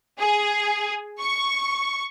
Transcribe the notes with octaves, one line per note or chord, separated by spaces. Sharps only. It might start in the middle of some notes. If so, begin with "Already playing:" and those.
G#4
C#6